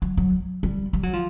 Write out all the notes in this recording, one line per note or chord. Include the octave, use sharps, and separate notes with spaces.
F#3
F#3
G3
G3
F#3
F3